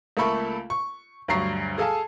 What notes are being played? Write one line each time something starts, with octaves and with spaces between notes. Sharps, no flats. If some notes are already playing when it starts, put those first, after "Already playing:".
C#2 A3 A#3 A4 B5 C#6
C#6
D2 G2 F#3 A#5 C#6 C7
G#4 A4 F5 G#5 A5